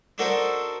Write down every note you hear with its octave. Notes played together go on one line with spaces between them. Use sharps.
D4 D#4 F#4 A4 A#4 C5